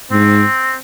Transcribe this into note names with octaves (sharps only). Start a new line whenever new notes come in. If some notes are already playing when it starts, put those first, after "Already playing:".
G#2 C4